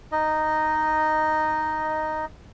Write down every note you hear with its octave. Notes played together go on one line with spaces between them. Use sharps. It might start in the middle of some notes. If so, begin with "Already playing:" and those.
D#4 D#5